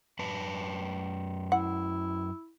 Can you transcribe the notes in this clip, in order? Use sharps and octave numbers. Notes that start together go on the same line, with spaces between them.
F#2 B4 A5
E4 F#5